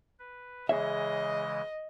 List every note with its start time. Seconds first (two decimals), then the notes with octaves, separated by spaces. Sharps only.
0.19 B4
0.69 C#3 E3 G#3 G#4 C#5 D#5 E5